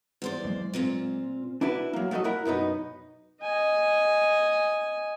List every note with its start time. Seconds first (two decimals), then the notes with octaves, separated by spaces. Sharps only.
0.22 E2 C5 D5
0.44 F#3 G#3 A#3
0.73 A#2 C4 F4
1.61 D4 E4 F#4 B4
1.93 F#3 A#3
2.11 F#3 A3 F#4 A4 D#5
2.24 E4 A#4 F#5
2.45 F#2 B2 B3 D#4
3.42 D#5 G#5